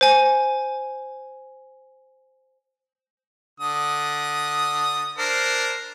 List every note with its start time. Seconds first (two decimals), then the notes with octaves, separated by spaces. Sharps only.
0.01 C5 G#5
3.60 D3 D#6
5.18 D4 A#4 C5